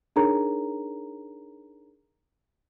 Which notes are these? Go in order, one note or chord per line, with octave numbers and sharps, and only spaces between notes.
D4 D#4 G#4 A#4 C#5 A#5